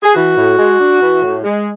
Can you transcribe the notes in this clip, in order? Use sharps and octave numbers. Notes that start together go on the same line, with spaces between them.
G#4
E3 F#4
A2
G#3
D4
E3
A2
G#3